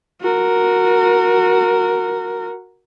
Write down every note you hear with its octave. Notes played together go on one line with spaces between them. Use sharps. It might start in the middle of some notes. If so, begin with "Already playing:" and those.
F#4 A#4